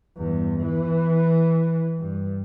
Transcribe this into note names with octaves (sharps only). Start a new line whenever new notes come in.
E2 G2
E3
G2